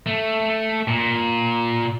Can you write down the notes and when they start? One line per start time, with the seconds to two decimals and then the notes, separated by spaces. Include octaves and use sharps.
0.06 A3
0.88 A#2